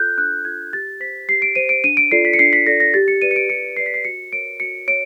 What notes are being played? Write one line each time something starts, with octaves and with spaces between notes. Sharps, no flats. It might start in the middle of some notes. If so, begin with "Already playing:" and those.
Already playing: F4 A4 F#6 G6
D4 F#6
F4 A4 G#6
G4 A6
C5 B6
G4 C7
D7
C5 D#7
D7
D4 D#7
D7
F4 A4 D5 C7
B6
C#7
D4 C7
B6
F4 A4 D5 A#6
A#6
G4 A6
C#7
B4 D5 D#7
C#7
D7
G4 C#7
B4 D5 C7
B6
C7
F#4 C#7
A#4 C#5 D7
F#4 C#7
C#5 D7